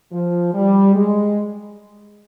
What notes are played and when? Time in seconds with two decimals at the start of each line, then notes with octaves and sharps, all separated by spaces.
0.11 F3
0.53 G3
0.95 G#3